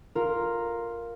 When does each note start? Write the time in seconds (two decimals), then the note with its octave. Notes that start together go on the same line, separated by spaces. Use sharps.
0.15 F4 A#4